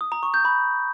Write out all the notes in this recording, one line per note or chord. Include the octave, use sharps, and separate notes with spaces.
D#6
A#5
C#6
G6
B5